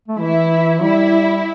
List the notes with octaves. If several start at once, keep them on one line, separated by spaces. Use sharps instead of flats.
A3
E3 E4
G3 E4